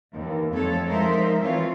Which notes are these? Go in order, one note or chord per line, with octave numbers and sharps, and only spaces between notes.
D#2 E3
F2 A3 A4 C#5
F3 G#3 D#4 A#4 C5 E5
E3 A3 C4 F4 C#5